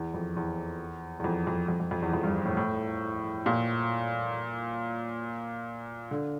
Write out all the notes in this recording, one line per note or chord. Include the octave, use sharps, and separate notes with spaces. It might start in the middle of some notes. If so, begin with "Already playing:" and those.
Already playing: E2
F2
E2
E2
F2
F2
F2
F2
F2
E2
F2
G2
A2
A2
A#2
D3